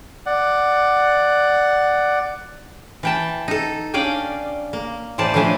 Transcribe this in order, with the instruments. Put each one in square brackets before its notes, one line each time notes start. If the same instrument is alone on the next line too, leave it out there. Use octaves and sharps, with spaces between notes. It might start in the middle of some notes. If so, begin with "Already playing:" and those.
[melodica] D5 F#5
[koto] E3 G5 A5
D#4 A4
C#4 D4 D5 F5 G5 G#5
A#3
A2 E3 C5 D5 A5
A2 E3 F3 A3 D4 G#5